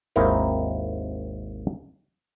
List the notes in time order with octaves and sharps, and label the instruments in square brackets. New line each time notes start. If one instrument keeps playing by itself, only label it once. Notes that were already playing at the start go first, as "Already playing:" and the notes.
[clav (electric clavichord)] G#1 D#2 C4 D#4 E4 A#4